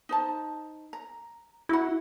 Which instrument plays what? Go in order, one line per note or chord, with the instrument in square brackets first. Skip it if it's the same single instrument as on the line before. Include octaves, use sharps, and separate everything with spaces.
[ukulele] D#4 C5 A5
A#5
[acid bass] E4 [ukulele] F#4 F#5